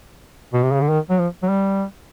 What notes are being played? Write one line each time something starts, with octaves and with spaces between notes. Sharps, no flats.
B2
C3
C#3
D3
D#3
F#3
F3
F#3
G3